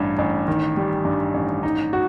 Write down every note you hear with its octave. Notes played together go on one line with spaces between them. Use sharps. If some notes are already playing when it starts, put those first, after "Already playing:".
Already playing: A1 G2
A1
D#3
G3
G2
A1
D#4
F#4